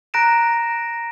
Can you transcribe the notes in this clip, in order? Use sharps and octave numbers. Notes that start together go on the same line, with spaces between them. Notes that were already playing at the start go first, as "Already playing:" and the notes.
A#5 F#6 A#6 D7 E7